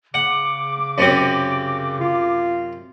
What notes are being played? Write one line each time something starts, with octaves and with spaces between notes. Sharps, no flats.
C#3 F#5 D6
F#2 C3 C4
F4